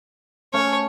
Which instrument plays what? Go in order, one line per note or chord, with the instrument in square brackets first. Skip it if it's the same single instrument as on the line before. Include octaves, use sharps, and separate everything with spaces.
[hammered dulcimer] A3 C#4 [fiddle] C#5